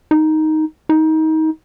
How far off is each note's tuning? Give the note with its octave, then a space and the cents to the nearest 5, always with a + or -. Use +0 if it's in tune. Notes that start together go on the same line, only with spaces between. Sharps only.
D#4 +5
D#4 +25